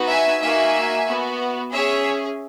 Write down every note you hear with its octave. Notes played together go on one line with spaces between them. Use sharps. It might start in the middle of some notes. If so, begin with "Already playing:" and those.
Already playing: B3 D#4 F#4
E5 G#5
A#3 D#4 F#4 E5 G#5
B3 F#4
C#4 G#4 C#5 E5